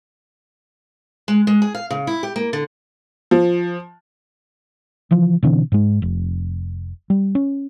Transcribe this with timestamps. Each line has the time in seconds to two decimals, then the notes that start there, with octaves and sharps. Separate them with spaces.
1.28 G#3
1.47 G#3
1.62 G#4
1.75 F5
1.91 C#3
2.07 E4
2.23 G4
2.36 A#3
2.53 D3
3.31 F3
5.11 C#3 E3 F3
5.43 B2 D3 E3 C4
5.72 G#2 G#3
6.02 F1
7.10 G3
7.35 C#4